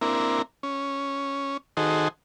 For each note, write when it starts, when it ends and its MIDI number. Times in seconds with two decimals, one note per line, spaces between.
0.01 0.42 58
0.01 0.42 60
0.01 0.42 62
0.01 0.42 64
0.01 0.42 70
0.63 1.57 61
1.77 2.08 51
1.77 2.08 63
1.77 2.08 66
1.77 2.08 68
1.77 2.08 69
1.77 2.08 72